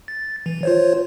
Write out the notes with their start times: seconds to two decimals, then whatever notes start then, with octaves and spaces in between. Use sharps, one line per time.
0.08 A6
0.46 E3
0.63 F4 C5 C#5